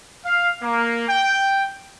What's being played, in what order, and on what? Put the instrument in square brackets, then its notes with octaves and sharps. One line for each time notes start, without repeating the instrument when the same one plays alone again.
[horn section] F5
A#3
G5